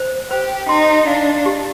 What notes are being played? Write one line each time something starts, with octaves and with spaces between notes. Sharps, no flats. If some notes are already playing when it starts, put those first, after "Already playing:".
Already playing: C5
G4 C5
D#4 C6
D4 F5
G4